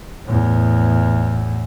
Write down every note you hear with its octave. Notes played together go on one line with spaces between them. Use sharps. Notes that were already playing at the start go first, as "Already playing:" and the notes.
E2 A2